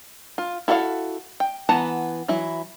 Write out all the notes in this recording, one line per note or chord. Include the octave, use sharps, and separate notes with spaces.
F4
E4 F#4 A4 D#5 F5
G5
E3 B3 F#5 A5 A#5
E3 F#3 E4